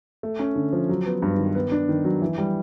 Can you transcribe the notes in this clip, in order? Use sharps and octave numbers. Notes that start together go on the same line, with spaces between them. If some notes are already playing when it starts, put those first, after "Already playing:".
A3
C#4
D3
F3
F#3
B3
G2
D#3
B3
D4
D#3
F#3
E3
G3